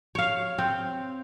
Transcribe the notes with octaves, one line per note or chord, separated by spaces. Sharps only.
C#5 F5
C4